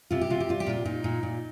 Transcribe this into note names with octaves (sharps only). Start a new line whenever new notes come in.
C3 F4
G4
C3 F4
G4
G3 F4
G4
A#2 F4
A#2 D#4
A#2
A#2